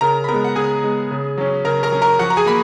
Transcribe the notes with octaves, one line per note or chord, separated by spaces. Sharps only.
C#3 A#4 A#5
B5
B3 A#4 A#5
G#3
F#5
C#3 G#4 G#5
G#3 B3
C#3
F#3 C#4
C#3 A#4 A#5
A#4 A#5
F#3 C#4
A#4 A#5
F3 F#4 F#5
A#5
G#4 G#5
A#3 B5